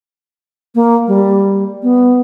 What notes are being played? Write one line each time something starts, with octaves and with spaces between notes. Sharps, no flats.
A#3
G3
B3